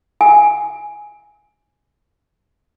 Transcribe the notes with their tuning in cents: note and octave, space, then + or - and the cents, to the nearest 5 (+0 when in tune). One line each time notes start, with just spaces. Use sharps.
G#5 +0